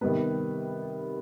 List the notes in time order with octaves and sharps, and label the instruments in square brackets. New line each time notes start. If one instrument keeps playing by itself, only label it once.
[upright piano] C3 D#3 G3 B3 B4